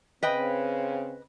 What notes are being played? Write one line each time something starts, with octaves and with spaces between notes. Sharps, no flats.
C#3 C4 B4 D#5 G5